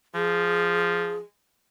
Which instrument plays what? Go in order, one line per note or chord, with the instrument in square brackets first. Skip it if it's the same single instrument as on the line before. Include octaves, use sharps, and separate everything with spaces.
[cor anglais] F3 [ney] G#4